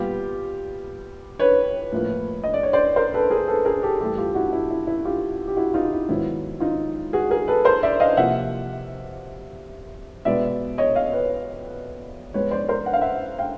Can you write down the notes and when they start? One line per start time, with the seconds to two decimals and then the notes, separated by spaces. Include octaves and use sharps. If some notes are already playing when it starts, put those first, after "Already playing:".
Already playing: A#2 G3 B3 F4 G4
1.39 B4 C#5
1.92 A2 F3 A#3
2.44 D#5
2.54 D5
2.63 C#5
2.73 C5 D5
2.96 A#4 C5
3.14 A4 B4
3.30 G#4 A#4
3.48 A4 B4
3.65 G#4 A#4
3.83 G4 A4
4.01 G2 E3 A3 G4 A4
4.17 F4 G4
4.35 E4 F#4
4.53 E4
4.70 E4
4.87 E4
5.05 F4 G4
5.48 G4
5.56 E4 F#4
5.74 D#4 F4
5.92 E4
6.09 G#2 D#3 F#3 B3 E4
6.60 D#4 F4
7.13 F#4 G#4
7.31 G#4 A#4
7.48 A4 B4
7.65 A#4 C5
7.83 D5 E5
8.00 D#5 F5
8.17 C3 F3 A#3 E5 F#5
10.25 B2 G#3 B3 D5 E5
10.78 C#5 D#5
10.95 D#5 F5
11.12 B4 C#5
12.34 G#2 F3 G#3 B3 B4 C#5
12.51 C5 D5
12.69 A#4 C5
12.86 F#5
12.93 F5
13.01 E5 F#5
13.39 F5 G5